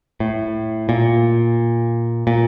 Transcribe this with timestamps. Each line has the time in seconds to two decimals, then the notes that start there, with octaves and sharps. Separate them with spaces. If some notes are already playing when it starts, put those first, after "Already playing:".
0.20 A2
0.89 A#2
2.27 A#2